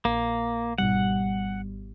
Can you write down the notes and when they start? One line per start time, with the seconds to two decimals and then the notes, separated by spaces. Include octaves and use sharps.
0.05 A#1 A#3
0.78 G#1 B2 G3 F#5